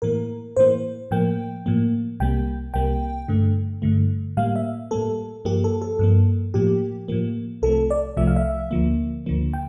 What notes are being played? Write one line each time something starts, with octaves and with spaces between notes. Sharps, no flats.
A2 E3 A#3 A#4
A2 E3 A#3 C5
A2 F3 A#3 G5
A2 F3 A#3
C2 C3 G3 A#3 G5
C2 C3 G3 A#3 G5
G2 D3 A3
G2 D3 A3
A2 G3 A#3 F5
E5
A2 G3 A#3 A4
G2 F3 A#3 G4
A4
A4
G2 F3 A#3
A2 F3 A#3 G4
A2 F3 A#3
C2 C3 F3 A3 A4
D5
C2 C3 F3 A3 E5
F5
E5
D2 D3 F3 A#3
D2 D3 F3 A#3
G5